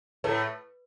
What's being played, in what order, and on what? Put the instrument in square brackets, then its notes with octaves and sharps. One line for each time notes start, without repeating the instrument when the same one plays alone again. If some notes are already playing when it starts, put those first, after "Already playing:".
[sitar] A2 A3 [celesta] B4